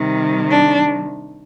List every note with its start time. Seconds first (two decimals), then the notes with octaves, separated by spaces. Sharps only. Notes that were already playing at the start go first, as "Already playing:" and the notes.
Already playing: C3 D#3 G3
0.50 D4